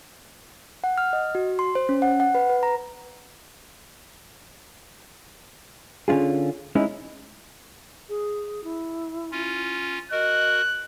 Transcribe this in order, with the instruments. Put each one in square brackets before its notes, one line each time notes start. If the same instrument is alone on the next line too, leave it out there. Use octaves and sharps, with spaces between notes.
[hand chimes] F#5
F6
D#5
F#4
C6
C5
C#4
F#5
F#5
B4
B4
A#5
[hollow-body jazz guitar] D3 C#4 D4 F4 G#4
G#3 C#4 D#4 E4
[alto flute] G#4
E4
[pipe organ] C#4 F4
[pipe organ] F#4 A#4 [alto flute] D#5 [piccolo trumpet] F#6